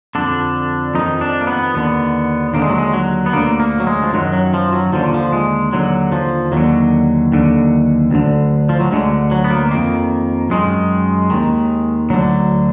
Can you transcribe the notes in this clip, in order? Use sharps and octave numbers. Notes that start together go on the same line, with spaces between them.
F2 D3 D4
F2 D#3 D#4
D4
A#3
B3
D#2 D3 B3
D#2 D3 A#3
G#3
F#3
G#3
F#3
B3
D2 D3 A#3
A#3
F#3
G#3
F3
F#2 D#3 F#3
F#3
F3
F#3
D#2 D3 F3
F3
G#3
D#2 D3 F#3
F3
D#2 D3 F#3
D#2 D3
D2 D3
F3
F#3
D2 D3 G#3
F#3
B3
A#3
F2 D#3 A#3
F#2 D#3 G#3
D#2 D#3
D2 D3 F#3